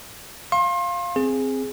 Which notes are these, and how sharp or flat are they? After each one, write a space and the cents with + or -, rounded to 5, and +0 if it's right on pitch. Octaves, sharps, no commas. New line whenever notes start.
F5 +0 C6 +35
C4 +0 G#4 +0